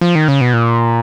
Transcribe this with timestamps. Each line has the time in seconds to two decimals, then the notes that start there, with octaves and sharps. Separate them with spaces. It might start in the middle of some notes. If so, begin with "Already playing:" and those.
0.01 F3
0.15 D#3
0.28 C#3
0.41 B2
0.53 A#2